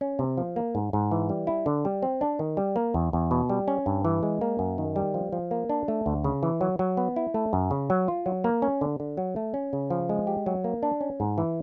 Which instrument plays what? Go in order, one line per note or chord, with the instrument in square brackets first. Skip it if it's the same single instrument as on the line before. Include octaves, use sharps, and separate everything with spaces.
[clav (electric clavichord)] C#4
C3
F3
A#3
G#2
G#2
E3
G3
E4
D3
G3
C4
D4
D#3
G3
A#3
E2
E2
B2
G3
C#4
G2
E3
G#3
A#3
F#2
D#3
G3
F3
F3
A#3
D4
A3
D2
C#3
E3
F#3
F#3
B3
E4
A3
F#2
C#3
F#3
F4
F#3
A#3
C#4
D3
D3
F#3
A3
C#4
C#3
F3
G#3
G4
F#3
A#3
D4
C#4
G#2
E3